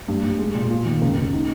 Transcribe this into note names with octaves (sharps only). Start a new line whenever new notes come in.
G2
G2
G#3
A#2
F4
D#3
C#2
C#2
D#4